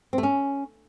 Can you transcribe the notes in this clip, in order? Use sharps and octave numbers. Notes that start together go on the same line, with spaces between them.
C4
A3
C#4